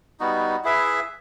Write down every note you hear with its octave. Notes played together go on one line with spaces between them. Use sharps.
G3 B3 D#4 F#4
E4 G#4 B4 E5